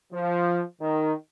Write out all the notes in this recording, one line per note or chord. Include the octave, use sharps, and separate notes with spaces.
F3
D#3